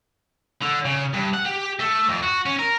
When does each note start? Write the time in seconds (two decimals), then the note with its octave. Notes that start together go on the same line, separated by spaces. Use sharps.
0.61 D3
0.85 C#3
1.13 G2
1.34 F#5
1.46 G4
1.79 A3
2.09 F2
2.23 F#4
2.46 C#4
2.59 A#4